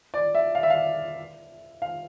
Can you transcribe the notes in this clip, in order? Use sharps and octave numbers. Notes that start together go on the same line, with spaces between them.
D5
E5
F5
E5
F5
F5